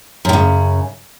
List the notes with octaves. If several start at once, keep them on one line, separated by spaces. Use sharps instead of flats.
F#2 A2 C#3